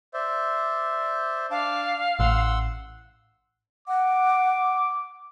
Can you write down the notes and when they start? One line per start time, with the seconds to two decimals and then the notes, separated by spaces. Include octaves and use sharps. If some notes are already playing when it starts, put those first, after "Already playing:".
0.14 C5 D5 E5
1.51 D4 F5 A5 D6
2.19 A1 F#5 C6 E6
3.88 F#5 D6